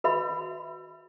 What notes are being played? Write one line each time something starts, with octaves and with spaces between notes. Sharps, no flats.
F#4 B4 E5 B5